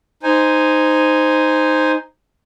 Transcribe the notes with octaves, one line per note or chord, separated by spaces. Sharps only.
D#4 C5 G#5